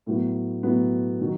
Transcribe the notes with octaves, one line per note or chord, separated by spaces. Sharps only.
A2 F#3 B3
A2 F#3 B3
D#3 F#3